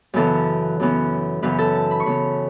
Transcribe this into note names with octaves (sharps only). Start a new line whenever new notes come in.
F#2 C#3 E3 B3 A4
F#2 C#3 E3 B3
F#2 C#3 E3 B3 B4
A4
A5
B5
C#6
F#2 C#3 E3 B3 B5